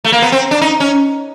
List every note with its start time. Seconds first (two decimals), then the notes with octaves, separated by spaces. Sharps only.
0.04 A3
0.12 A#3
0.22 B3
0.32 C4
0.51 D4
0.61 D#4
0.80 C#4